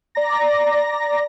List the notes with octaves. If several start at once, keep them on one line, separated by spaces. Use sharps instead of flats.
D5 A#5 A#6